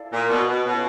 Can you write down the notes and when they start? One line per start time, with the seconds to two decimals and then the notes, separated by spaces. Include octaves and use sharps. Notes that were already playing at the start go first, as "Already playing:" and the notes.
Already playing: E4 A4 D5 F5
0.12 A#2
0.30 B2
0.49 B2
0.66 B2 C#4 F4 A4 C#5